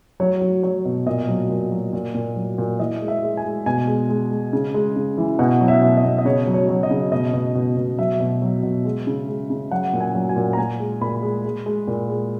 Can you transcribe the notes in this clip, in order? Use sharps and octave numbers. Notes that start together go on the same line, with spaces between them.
F#3 C#5
F#3
F#3 C#5
B2
A#2 D#5
F#3
A#2
F#3
A#2
A#2
F#3
A#2
E3 D#5
G#3
E5
G#3
G#5
G#3
B2 G#5
G#3
G#3
G#3
C#3
G#3
C#3
E3
B2 F#5
F#3
E5
B2
D#5
B2
D#5
C#3 C#5
F#3
C#5
F#3
D#5
C#3
B2 D#5
B2
B2
B2
F#3 E5
B2
F#3
B2
G#3
C#3
G#3
C#3
F#3 F#5
A#2
G#5
F#3
G#5
A#2
A#5
A#2 G#5
G#3
A#2 B5
G#3
G#3
G#3
A#2
G#3